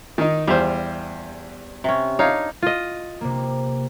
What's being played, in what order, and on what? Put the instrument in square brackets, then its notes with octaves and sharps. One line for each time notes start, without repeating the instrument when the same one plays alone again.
[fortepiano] D#3 D#4
[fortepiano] E2 C5 [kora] G3 E5 F5
[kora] C3 C#4
[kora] D4 D#4 [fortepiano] C#5 F5
[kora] F4 D#5
[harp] C3 A#3